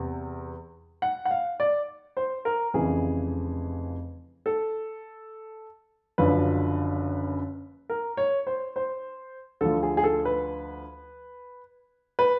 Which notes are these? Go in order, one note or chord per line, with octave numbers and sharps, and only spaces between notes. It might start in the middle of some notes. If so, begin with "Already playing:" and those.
Already playing: E2 C3
F#5
F#5
F5
D5
C5
A#4
F1 F2 C#3 E3 G#4
A4
F#1 F#2 D3 F3 B4
A#4
C#5
C5
C5
D2 D3 F3 A4
G#4
G#4
A4
B4
B4